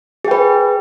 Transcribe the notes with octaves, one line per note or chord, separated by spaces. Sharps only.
G#4 B4 G5